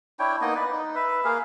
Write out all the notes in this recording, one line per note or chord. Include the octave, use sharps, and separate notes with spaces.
D4 E4 C#5 G5
A#3 B3 D#4 D#5
B4 D5
D#4
B4 E5
A#3 G#4 A#4 F5